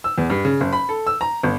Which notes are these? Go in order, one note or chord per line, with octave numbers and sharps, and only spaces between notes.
E6
E2
G2
C#3
F#1
B5
A4
E6
A#5
G1